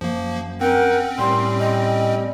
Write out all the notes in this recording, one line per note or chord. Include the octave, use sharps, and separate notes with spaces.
F#2 F3 A#3
C4 C#4 A#4 F#5 G5
A2 G3 C6
D#5